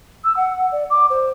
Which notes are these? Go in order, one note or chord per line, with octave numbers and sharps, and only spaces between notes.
E6
F#5
D5
D6
C5